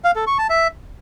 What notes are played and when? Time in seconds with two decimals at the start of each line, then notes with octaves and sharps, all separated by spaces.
0.04 F5
0.16 A4
0.27 C#6
0.38 A5
0.50 E5